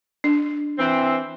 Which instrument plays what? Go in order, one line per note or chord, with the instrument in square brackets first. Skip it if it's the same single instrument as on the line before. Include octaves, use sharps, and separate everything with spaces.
[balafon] D4
[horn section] E3 C4